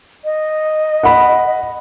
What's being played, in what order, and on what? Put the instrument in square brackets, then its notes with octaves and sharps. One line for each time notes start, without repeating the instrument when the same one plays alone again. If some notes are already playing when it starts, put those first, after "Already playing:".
[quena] D#5
[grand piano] F#5 B5